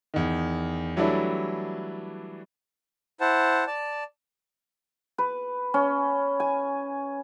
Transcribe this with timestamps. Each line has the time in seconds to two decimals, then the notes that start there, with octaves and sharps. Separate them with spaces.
0.14 E2 D#3
0.96 E3 F#3 G3 A3 D4 E4
3.21 E4 C5 F#5 A5
3.67 D5 A5
5.18 B4
5.74 C#4
6.40 G#5